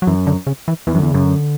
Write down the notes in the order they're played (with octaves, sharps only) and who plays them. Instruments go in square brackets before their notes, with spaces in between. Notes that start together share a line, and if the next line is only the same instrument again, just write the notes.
[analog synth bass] F#3
[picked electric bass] F#2 [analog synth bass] E3
[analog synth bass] D3
C#3
E3
[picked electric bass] E2 [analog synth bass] E3
[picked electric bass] F#2
[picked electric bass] E2 [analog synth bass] D3
[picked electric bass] F#2 [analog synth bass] C#3
[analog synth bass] D3